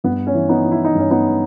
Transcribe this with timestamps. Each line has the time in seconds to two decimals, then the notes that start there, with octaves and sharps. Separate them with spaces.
0.04 G2 B3
0.27 C#4
0.34 E3
0.49 B3 D#4
0.64 E3
0.72 E4
0.85 D#4
0.95 G2 C#4
1.11 B3 D#4